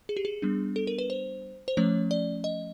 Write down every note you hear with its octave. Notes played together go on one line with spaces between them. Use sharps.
G#4
G4
G#4
G3 B3 D4
A4
A#4
B4
C5
C5
F3 A3 C#4 C#5
D5
D#5